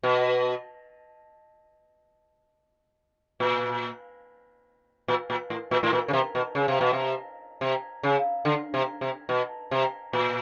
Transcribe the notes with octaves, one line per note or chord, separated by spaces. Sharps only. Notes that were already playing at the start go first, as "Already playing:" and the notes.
B2
A#2
A#2
A#2
A2
A#2
A2
A#2
C#3
C3
B2
C#3
C3
B2
C3
C3
C#3
D3
C3
C3
B2
C3
A#2